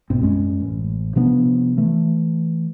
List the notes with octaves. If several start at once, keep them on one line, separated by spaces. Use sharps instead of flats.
B1 G#2 B3 C4
F#2 G#3 C4 C#4
A1
C3 F3 B3 D4
E3 A3